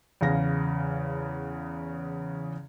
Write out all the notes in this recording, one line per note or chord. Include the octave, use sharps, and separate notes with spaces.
E2 C#3 F5 A#6